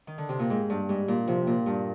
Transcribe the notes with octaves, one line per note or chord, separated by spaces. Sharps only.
D#3
D3
C3
A#2
G#2 G#3
G2
G#2 G3
A#2
C3 F3
A#2
G2